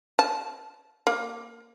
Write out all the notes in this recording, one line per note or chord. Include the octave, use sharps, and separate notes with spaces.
A5
A#3